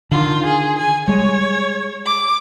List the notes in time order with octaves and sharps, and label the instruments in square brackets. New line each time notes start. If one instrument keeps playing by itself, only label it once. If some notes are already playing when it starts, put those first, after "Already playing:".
[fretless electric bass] D3 D#3 [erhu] F4
[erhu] G#4
G#5
[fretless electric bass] G3 G#3 [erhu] C#5
[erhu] D6